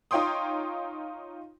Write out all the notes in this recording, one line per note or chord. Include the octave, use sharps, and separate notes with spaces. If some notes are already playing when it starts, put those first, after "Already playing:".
D#4 F4 C#5 G5 C6 D#6